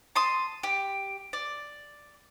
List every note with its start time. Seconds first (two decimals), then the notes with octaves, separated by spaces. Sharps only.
0.16 A5 C6 D#6
0.63 G4
1.33 D5